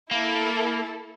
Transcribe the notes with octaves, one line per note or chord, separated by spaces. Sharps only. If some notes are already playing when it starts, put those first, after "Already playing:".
A#3 E4 A4